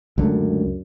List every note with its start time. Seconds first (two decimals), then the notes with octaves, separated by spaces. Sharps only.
0.18 C#2 F#2 D3 A3